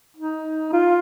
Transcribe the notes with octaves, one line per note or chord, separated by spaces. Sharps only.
D#4
F4